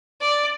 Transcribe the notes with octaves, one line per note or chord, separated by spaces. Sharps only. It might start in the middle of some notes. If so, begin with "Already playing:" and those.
D5